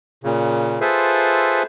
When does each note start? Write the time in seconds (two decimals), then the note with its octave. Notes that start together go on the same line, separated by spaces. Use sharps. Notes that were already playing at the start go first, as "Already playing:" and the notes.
0.24 A#2 C#3
0.81 F4 G#4 A4 B4 C5 E5